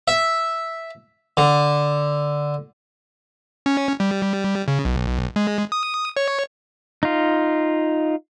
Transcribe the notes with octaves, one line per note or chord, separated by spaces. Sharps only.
E5
D3
C#4
G3
C#3
B1
G#3
D#6
C#5
D#4 F4